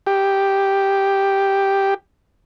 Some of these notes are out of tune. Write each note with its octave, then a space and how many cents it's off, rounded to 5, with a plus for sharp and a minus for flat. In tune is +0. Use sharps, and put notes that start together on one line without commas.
G4 +0